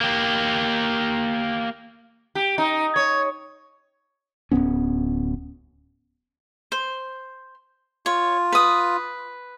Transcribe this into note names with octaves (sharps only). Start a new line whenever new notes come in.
A#3 G4
G4
D#4
C#5
D1 B2 B3 C#4
C5
F4 C#5
B4 D#6